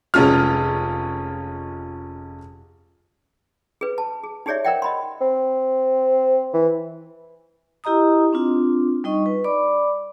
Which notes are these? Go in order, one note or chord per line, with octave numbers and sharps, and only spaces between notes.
F1 G#3 C#4 F4 F6
G#4 B4
A5
G#4
D#4 G4 G#4 C#5 D5 E5
A#4 C5 D5 E5 F#5 G5
D#5 B5 C6
C4
E3
E4 G4 D#5 A#5 D#6
C4 D4 F4
G3 D#4 D#5 C#6
B4
D5 B5 D6